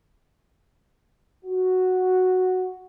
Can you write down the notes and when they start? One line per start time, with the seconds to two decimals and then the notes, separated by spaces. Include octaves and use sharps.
1.45 F#4